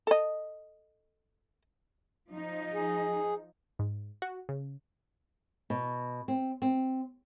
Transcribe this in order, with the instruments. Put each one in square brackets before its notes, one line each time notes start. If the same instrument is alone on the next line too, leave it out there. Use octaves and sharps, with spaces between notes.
[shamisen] A4 D#5
[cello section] F3 D#4
[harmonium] G#4
[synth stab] G#2
F#4
C#3
[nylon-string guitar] B2
C4
C4